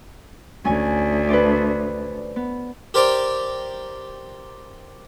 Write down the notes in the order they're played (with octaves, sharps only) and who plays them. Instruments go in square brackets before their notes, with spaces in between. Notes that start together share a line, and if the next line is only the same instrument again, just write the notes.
[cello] D2 [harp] C#4 G#5
[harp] B4 C5 D5
B3
[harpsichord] G4 A#4 C5 D5 G5 A#5